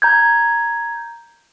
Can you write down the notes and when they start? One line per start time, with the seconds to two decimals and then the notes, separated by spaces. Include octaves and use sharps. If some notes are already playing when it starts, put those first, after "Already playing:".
0.02 A#5 G6 G#6